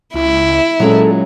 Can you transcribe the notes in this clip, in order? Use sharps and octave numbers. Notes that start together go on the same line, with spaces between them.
C#2 E4
A#2 F#3 G#3 C#4 A4